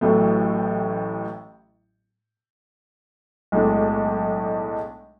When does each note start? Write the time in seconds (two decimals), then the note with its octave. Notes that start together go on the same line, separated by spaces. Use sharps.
0.01 A1 A2 F#3 A3
3.52 B1 A2 G#3 D4